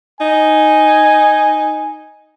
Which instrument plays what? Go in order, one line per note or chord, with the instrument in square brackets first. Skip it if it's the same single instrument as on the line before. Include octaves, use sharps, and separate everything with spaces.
[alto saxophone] D#4 [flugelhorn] G#5